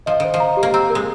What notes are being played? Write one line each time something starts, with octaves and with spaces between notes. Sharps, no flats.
F3 D#5
D#3 C5
F3
A#5
G4
A#3
C4 A#5
A#4
G#3